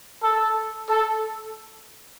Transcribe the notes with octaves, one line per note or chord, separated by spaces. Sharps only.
A4
A4